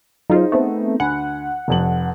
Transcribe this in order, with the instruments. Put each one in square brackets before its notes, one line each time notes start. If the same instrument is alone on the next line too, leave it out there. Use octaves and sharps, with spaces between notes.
[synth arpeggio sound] F#3 F4 [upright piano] D#4 G#4 C5
[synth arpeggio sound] A3 B3 C4
[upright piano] D2 G#5 B5 [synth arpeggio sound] F#5
[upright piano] F1 F2 F#7